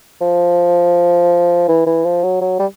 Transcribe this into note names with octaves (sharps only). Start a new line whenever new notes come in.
F3
E3
E3
F3
F#3
F#3
G3